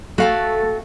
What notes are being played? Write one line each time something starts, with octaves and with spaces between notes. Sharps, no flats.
A3 F#4 A4 F5 G5